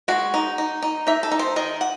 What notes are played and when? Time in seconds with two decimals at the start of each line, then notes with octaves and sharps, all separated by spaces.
0.08 G#3 F#4
0.34 D#4
0.58 D#4
0.82 D#4
1.07 D#4 E5
1.23 A4
1.32 D#4
1.39 C5
1.56 D#3 D#5
1.81 F#5